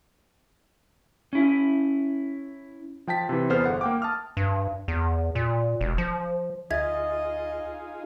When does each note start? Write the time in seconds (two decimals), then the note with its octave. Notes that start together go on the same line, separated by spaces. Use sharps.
1.33 C#4 E4
3.07 F3 G5 A5 B6
3.29 C3 E3
3.50 E2 B3 G#4 A4 C5 F6
3.66 G1 F#5
3.81 A#3 G5 D6
4.02 A5 D#6 F6
4.37 G2
4.88 E2
5.35 A#2
5.81 E1
5.98 F3
6.71 D2 D#4 F4 G#4 D#5 E5 G#6 A6